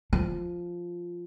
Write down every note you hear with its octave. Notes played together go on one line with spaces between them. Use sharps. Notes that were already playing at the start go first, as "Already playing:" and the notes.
F3